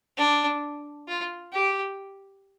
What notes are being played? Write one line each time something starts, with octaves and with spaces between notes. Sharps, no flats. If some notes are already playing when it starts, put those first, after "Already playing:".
D4
F4
G4